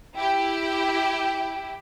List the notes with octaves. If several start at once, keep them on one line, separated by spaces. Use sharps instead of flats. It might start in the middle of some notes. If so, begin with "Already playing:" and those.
E4 G4 G5